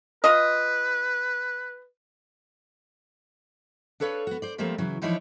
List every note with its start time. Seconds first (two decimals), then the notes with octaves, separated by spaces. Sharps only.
0.24 F4 B4 D#5
4.00 D4 A4 B4 C#5 F5
4.27 B3 F#4
4.42 C5 D5
4.58 F3 G3 A3 A#3 C4
4.78 C#3 E3 F#3
5.02 E3 F3 D#4 E4 C#5 D5